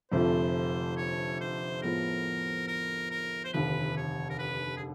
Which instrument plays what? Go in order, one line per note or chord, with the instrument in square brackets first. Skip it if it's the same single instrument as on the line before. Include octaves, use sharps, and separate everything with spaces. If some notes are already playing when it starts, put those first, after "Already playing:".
[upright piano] F1 F2 D3 F3 A3 [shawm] C5
[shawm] C#5
C5
[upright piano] A2 F3 G#3 B3 [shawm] A#4
[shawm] A#4
A#4
C5
[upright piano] F1 D#2 D3 [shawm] B4
[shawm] C#5
A#4
B4
G#4